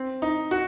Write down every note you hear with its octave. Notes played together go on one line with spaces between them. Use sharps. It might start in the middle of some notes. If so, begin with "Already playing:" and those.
Already playing: C4
D#4
F#4